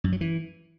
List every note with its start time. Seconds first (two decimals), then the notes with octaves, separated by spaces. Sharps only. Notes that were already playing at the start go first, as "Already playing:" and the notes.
0.04 F#2
0.12 F#3
0.21 E3